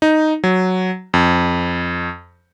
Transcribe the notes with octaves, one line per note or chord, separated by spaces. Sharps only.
D#4
F#3
F2